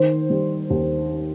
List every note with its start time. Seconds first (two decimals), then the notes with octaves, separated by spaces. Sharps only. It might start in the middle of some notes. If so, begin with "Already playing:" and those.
Already playing: D#3 C5
0.30 G3
0.70 D#2